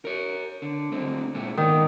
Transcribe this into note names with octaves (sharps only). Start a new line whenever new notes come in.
A#4 C#5
D3
D3 A3 C4
A#2 G#3 A3
G#2 D#3 A#3 B3